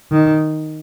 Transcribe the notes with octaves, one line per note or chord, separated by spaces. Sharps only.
D#3